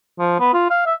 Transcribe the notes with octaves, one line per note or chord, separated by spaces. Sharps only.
F3
B3
F4
F5
E5